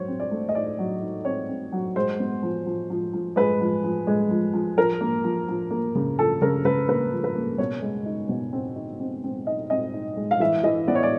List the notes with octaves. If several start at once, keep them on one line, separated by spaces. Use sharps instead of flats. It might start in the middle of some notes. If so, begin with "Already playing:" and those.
Already playing: F#3 C5 C#5
C4
D5
A3
D#5
D#4 D5
F#3
D#4
C4 C#5
C4
F#3
G#3 C5
B3
F3
F3
F3
F3
G#3 B4
F3
F3
G#3
F3
F3
F3 A#4
A#3
F3
F3
A#3
C#3
F3 A4
C#3 A#4
C#3 B4
A#3 B4
F3
B4
A#3
B2 C#5
G#3
D#4
B2
C4
D#4
C4
C4
D#4 D#5
C4 D#5
D#4
G#3
F5
E3 E5
E3 D#5
B3 D5
C#5
D5